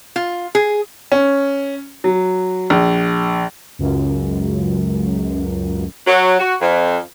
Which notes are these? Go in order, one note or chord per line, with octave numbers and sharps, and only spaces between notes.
F4
G#4
C#4
F#3
A#1
C#2 F#2
F#3
F#4
F2